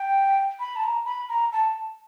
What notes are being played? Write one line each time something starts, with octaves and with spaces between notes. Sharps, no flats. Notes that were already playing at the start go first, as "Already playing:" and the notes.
Already playing: G5
B5
A5
A#5
B5
A#5
A5